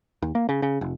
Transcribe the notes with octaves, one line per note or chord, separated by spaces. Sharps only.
D#2
A#3
C#3
C#3
F1